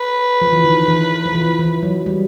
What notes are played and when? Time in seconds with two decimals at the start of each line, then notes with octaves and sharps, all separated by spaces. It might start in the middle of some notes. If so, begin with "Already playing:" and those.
Already playing: B4
0.41 F3
0.53 E3
0.64 D#3
0.88 E3
1.25 F3
1.35 E3
1.59 E3
1.83 F#3
2.06 G3